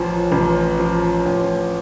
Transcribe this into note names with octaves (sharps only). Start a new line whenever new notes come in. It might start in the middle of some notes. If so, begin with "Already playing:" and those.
Already playing: A1 F3
A1
F3
A1